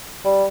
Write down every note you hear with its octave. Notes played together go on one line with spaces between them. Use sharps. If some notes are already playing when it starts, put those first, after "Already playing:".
G3